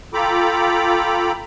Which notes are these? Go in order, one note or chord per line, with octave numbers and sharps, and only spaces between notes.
F4 A4 G5 A#5 B5 D6